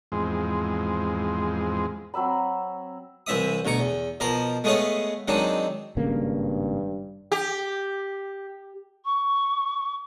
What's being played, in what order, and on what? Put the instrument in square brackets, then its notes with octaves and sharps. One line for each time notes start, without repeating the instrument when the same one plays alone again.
[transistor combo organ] E2 G#2 F3 G#3 C4
[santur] F#3 C4 E5 B5
[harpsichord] C2 E3 C4 E5 D#6
D2 B2 A#5 C#6
E2
B2 F3 A#4 C5 A#5
G#3 A3 B3 G#4 C#5 F5
D#3 F#3 G#3 C4 D4 D#4
[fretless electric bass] G#1 C#3 A#3 [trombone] G2
[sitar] G4
[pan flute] C#6